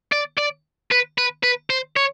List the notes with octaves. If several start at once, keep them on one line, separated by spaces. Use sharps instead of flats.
D5
D5
B4
B4
B4
C5
C#5